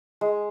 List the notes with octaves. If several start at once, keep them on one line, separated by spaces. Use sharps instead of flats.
G#3